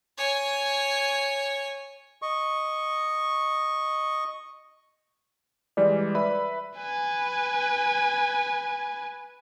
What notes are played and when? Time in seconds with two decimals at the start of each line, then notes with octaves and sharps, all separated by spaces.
0.18 C#5 G#5
2.22 D#5 C#6
5.77 E3 G3 G#3 D5
6.15 B4 E5 B5
6.78 B4 G#5